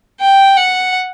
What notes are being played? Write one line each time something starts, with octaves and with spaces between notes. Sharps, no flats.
G5
F#5